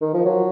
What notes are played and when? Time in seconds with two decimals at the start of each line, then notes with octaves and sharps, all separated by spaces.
0.01 D#3
0.14 F3
0.25 F#3